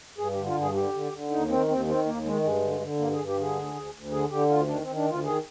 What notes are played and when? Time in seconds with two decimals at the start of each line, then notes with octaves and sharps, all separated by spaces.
0.18 G2 G#4
0.32 D3 G4
0.46 F4
0.55 G2 G#4
0.74 D3 G4
0.93 D3
1.12 D3
1.30 D#2 D#4
1.49 D#3 C4
1.68 D#2 C4
1.87 D#3 C4
2.05 D#2 A#3
2.24 D#3 G#3
2.43 G2 G#3
2.62 D3
2.80 D3
2.99 G2 A#3
3.13 G2 G#4
3.27 G4
3.37 D3 G#4
3.55 D2
3.74 D2
3.93 D2
4.12 D3 G#4
4.30 D3 G4
4.49 D2 F4
4.68 D#3 D4
4.82 D#3 C4
4.96 D4
5.05 D2 F4
5.24 D#3 G#4